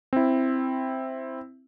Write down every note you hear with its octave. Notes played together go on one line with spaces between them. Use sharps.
C4 E4